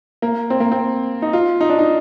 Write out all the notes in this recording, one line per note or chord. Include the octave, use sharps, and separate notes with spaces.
A#3
C4
A#3
C4
D#4
F4
D#4
D4
D#4